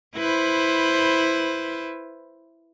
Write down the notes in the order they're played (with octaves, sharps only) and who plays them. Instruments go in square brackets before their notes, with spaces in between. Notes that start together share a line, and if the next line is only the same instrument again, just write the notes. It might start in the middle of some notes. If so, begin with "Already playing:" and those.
[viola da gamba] E4 B4 C5